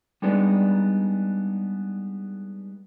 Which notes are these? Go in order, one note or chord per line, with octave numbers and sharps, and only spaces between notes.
G3 G#3 B3 D4 D#4 D5